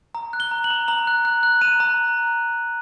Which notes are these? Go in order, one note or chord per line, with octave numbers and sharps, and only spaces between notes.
A#5
F#6
G7
A#5
F#7
A#5
A#5 F#7
F#6
F#6
F#6
A#5 D#7
A#5